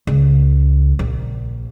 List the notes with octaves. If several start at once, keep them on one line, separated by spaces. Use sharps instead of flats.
C#2
A#1